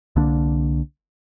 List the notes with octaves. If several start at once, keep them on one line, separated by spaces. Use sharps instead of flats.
C2 D3 A#3 D4